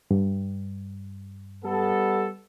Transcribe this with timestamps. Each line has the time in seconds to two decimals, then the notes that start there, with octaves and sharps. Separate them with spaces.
0.11 G2
1.65 G3 B3 A4